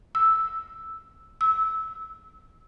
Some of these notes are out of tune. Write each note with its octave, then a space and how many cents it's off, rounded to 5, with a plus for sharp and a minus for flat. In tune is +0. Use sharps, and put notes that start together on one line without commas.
E6 -5
E6 -15